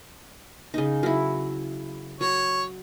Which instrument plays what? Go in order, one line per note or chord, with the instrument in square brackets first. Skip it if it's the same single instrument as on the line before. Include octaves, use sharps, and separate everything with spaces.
[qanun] C#3 D#4
F#3 E4
[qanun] F#3 [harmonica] C#5